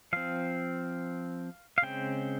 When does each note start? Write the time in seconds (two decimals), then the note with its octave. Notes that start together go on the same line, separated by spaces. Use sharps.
0.13 F3 C4 F5
1.78 F5
1.82 C#3 G#3 C4 G5